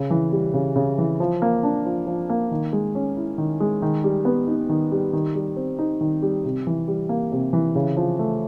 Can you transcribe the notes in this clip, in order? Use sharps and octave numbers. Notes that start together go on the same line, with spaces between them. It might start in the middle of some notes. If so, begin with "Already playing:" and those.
Already playing: C#3
E3
G3
C#3
C#3
E3
F3
A#3
D4
F3
F3
A#3
D#3
G#3
C#4
E4
D#3
G#3
D#3
G3
B3
D#4
D#3
G3
D#3
G3
C4
D#4
D#3
G3
C3
E3
G3
A#3
C3
E3
C#3
F3
A3